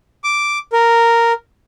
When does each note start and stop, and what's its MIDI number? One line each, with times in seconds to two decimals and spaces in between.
0.24 0.59 86
0.73 1.32 70